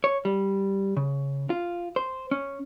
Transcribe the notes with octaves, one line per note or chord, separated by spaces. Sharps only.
C#5
G3
C#3
F4
C5
C#4